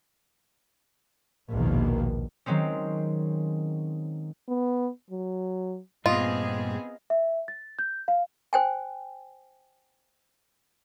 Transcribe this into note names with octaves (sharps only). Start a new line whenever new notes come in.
A#1 D#2 G#2 B2 D#3 A#3
D#3 F#3 G#3 C4 C#4
B3
F#3
G2 A#2 B3 C4 F4 G#4 D#5
E5
A6
G6
F5
C5 G5 G#5